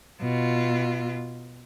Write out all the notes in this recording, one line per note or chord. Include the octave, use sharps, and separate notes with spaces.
B2 F4